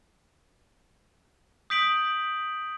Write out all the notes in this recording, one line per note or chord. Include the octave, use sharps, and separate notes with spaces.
D#6 G6 B6 D7 F#7